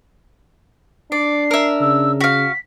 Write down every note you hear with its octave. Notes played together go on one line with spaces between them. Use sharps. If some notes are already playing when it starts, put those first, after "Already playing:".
D4 D5 C7
A#4 E5
C#3 E6
F#4 F5 B6